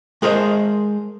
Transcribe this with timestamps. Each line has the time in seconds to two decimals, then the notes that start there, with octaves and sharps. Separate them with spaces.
0.22 G#3 G#4 A#4 C5 D#5